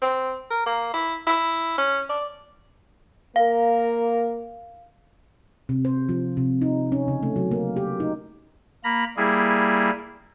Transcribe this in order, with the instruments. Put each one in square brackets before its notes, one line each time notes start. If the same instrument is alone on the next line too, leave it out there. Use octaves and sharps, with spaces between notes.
[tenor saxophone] C4
A#4
A#3
E4
E4
C#4
D5
[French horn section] A#3 A#4 [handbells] F5
[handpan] C3
C5
F3
C3
D#4
C#4
C#3
A3
F#3
A#3
G4
D#4
[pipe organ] A#3 A#5 B5
G3 A#3 E4 G#4